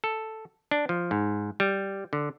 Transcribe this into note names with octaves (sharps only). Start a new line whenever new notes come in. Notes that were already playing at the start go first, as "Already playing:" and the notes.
A4
D4
F3
G#2
G3
D3